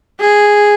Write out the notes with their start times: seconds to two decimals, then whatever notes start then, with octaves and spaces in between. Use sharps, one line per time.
0.20 G#4